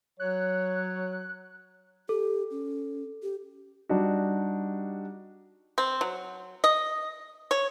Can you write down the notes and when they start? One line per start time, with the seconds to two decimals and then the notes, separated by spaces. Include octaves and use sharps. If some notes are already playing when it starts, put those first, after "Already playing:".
0.20 F#3 C#5 F#6
2.09 G4 A4
2.51 C#4
3.23 G4
3.89 G3 D4 D#4 F#4
5.78 C4
6.01 F#3
6.64 D#5
7.51 C#5